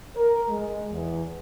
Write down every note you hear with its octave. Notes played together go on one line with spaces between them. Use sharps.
A#4
G#3
E2